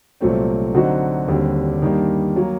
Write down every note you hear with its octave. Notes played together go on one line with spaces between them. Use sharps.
C2 A#2 F#3 A3 C4
D3 F#3 C4 D#4 F#4
D#2 D3 G3 C4
G2 D#3 G3 A#3 D4
F#3 A#3